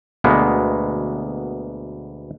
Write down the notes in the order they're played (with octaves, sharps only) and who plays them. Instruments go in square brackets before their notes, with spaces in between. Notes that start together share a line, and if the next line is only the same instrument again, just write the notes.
[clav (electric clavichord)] D2 B2 G#3 A#3 B3